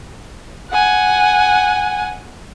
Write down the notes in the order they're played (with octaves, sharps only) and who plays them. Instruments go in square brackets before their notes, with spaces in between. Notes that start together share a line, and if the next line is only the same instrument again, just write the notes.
[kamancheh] F#5 G#5